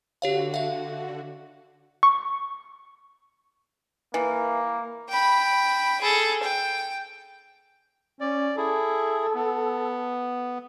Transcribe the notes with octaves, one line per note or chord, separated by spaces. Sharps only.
D3 F#4 G4 C#5 F5
E5 F5
C#6
E3 A#3
G5 B5
G#4 A4
G5
C#4 D5
E4 G#4 A4
B3